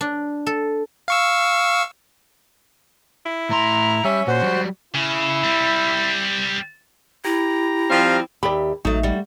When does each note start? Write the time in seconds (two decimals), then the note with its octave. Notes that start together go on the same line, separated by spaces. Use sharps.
0.01 D4
0.47 A4
1.08 F5 C#6 E6
3.26 E4
3.50 A2 A#5 C6
4.04 G3 C#4 E5
4.27 A#2 F#4 C5
4.42 F#3 G3
4.94 C#3 E4
5.44 G3 C4
7.25 E4 G4 A#5
7.90 F3 G3 C4 F5
8.43 D#2 G4 D5 E5 B5
8.85 A1 F#3 A3 D#4
9.03 G3 F#4